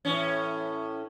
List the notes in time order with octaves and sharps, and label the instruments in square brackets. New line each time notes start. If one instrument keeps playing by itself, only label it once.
[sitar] A2 E3 C#4